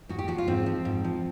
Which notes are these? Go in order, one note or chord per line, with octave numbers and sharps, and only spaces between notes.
G#2 F#4
G4
F3 F#4
F4
G#2 C4
F3
G#2
F3